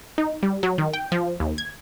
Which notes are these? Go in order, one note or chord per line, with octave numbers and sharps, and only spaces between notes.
D#4
G3
F#3
D#3
G5
F3
D#2
G#6